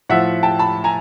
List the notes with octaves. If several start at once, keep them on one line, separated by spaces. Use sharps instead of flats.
A2 F3 E5 F#5
G5 A5
A5 B5
G#5 A#5